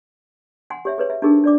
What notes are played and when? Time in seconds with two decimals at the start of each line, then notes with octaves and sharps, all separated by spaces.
0.70 F#5 G#5 C6
0.85 G4 C#5 E5
0.98 G#4 B4 C#5
1.10 E5
1.22 D4 D#4 G4 G#4 A#4
1.44 D4 D5 D6